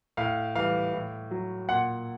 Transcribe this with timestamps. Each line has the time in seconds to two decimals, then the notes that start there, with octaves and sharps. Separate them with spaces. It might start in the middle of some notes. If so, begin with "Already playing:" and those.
0.17 A2 F5
0.55 E3 G3 F5
0.93 A2
1.31 F#3
1.69 A#2 F#5